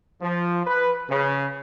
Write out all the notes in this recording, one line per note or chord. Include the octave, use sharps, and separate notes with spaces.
F3
B4
C#3